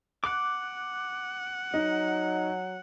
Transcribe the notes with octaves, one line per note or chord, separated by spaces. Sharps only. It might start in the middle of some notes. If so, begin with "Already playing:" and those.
F#5 D6 F#6
F#3 D#4